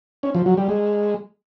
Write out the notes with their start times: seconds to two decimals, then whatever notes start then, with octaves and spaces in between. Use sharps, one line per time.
0.23 C#4
0.35 F3
0.46 F#3
0.57 G3
0.69 G#3